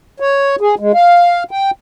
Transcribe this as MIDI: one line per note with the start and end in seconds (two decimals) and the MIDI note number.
0.20 0.56 73
0.61 0.75 68
0.79 0.92 56
0.94 1.43 77
1.51 1.71 79